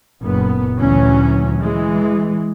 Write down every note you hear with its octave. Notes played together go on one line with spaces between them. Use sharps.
F#1 A#2 B3
D2 A#2 E3 F#3 C#4
E3 G#3